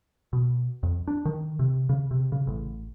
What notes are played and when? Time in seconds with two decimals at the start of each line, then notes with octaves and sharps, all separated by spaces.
0.33 B2
0.83 F2
1.08 D4
1.25 D#3
1.59 C3
1.89 C#3
2.11 C3
2.32 C#3
2.47 A1